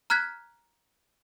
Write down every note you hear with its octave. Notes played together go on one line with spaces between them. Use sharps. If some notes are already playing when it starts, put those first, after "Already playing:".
A#5 F6 F#6 G#6 B6